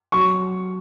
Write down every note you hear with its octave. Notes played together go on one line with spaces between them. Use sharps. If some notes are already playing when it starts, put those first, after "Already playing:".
F#3 C#6